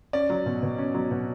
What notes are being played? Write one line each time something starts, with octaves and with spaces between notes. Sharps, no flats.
C#4 D5
F#3
B2
B2
C#4
F#3
B2